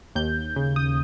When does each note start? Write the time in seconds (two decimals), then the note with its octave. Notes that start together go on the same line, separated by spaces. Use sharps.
0.15 D#2 G6
0.56 C#3
0.76 D#6